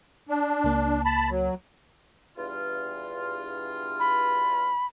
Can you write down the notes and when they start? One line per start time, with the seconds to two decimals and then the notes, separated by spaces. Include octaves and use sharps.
0.29 D4
0.64 C#2 A#3
1.05 A5 B5
1.30 F#3
2.37 E2 G2 F4
4.00 B5